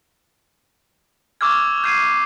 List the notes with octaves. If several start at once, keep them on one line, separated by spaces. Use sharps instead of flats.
C#6 D6 E6 F6 G#6
G6 G#6 C7 D#7